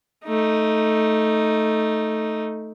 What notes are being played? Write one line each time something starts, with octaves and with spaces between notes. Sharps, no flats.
A3 D#4